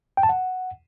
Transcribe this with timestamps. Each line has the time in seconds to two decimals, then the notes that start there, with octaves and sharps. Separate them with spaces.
0.17 G5
0.23 A5
0.29 F#5